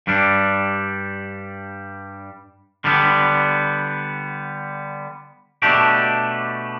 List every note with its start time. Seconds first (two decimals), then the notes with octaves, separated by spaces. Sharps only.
0.07 G2 G3 D4
2.84 D3 G3 B3
5.62 B2 A3 D4 G4